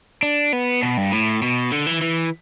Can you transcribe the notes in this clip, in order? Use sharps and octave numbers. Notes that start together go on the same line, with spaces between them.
D4
B3
B2
G2
A2
B2
D3
E3
E3